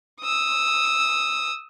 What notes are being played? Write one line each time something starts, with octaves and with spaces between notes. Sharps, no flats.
D#6 E6